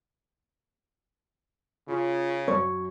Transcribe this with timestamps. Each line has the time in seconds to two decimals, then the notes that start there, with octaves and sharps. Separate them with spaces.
1.88 C#3 F4
2.48 F#2 F#3 C#5